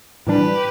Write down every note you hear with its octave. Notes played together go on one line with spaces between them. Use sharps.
A2 E3 G3 D4 G4 B4